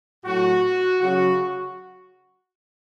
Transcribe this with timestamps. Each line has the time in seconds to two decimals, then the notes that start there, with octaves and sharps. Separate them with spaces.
0.24 A2 F#3 F#4
1.00 C#3 F#3 F#4